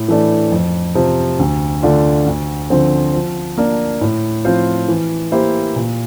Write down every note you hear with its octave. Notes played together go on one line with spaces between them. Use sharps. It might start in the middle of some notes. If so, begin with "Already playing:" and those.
Already playing: A2
E3 A3 D4
F2
C3 F3
D2
D3 A3 D4 F4
D2
D3 F3 C4
F3
A#3 D4
A2
F3 C4 F4 C5
E3
A#3 E4 G4 C5
A#2